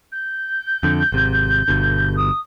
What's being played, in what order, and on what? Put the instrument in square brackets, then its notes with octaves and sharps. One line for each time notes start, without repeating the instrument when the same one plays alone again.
[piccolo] G6
[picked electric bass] F2 D3
G#1 C3
G1 B2 D3
[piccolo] D#6